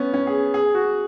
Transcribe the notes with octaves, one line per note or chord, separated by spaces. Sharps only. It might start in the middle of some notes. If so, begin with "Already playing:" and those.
Already playing: B3 C#4
C#4
G#4
G#4
F#4